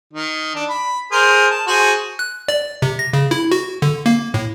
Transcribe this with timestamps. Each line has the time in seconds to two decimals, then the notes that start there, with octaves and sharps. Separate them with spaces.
0.14 D#3
0.55 D4
0.70 B5
1.12 G#4 A#4 C5
1.51 A5
1.67 F#4 G#4 C5
2.19 F#6
2.48 D5
2.82 C3
2.99 A#6
3.13 C#3
3.31 E4
3.52 F#4
3.82 D3
4.06 A#3
4.34 A2